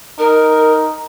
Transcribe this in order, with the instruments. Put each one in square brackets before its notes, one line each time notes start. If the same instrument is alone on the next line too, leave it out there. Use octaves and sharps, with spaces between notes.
[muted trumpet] D#4 [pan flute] A#4